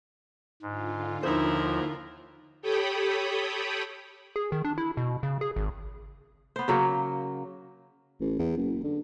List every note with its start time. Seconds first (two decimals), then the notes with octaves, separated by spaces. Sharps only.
0.62 G#2 D3 F4
1.23 D#2 F3 D#4 E4 A#4 C5
2.62 G4 A4 C#5 G5 B5 D#6
4.36 G#4
4.52 D#3
4.65 D4
4.78 E4
4.97 B2
5.23 C#3
5.41 G#4
5.56 G#1
6.56 B3 C5
6.68 C#3 F#3 A#3
8.21 A1
8.39 E2
8.57 F#1
8.84 D3